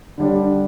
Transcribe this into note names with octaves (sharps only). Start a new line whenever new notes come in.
D3 G3 D4